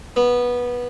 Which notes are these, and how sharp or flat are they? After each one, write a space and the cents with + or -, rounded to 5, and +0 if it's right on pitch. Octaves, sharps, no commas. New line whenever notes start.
B3 -15